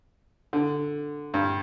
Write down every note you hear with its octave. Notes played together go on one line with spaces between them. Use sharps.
D3
G2